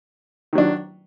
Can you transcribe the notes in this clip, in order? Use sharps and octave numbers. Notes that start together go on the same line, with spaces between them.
D#3 F#3 D4